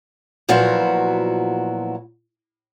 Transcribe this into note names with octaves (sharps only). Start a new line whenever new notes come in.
A#2 F3 F#3 B3 E4 F#4